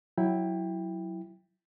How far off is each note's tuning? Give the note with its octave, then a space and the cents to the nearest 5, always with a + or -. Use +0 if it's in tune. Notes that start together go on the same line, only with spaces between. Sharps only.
F#3 +0 E4 +0 G5 +15